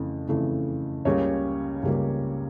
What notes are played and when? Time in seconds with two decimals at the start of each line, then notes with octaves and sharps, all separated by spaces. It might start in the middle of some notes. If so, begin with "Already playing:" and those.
Already playing: F2 C#3 E3 A3
0.28 F2 C#3 E3 A3
1.05 C#2 C#3 G3 A#3 C#5
1.83 C#2 C#3 G3 A#3